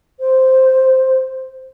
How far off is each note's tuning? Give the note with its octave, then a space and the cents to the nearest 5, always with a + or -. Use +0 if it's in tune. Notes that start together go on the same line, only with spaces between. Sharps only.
C5 +0